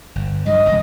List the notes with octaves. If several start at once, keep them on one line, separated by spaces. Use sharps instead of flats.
G1
G2 F#3 D#5
E1 C#2